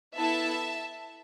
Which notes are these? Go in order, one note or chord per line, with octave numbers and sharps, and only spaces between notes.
B3 E4 A4 E5 A5